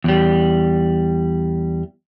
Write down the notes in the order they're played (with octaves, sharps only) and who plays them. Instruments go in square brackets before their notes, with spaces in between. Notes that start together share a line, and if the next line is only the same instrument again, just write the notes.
[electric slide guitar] E2 G3